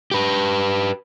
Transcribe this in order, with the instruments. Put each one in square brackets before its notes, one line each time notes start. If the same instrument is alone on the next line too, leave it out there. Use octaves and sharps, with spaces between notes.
[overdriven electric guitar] G4 B4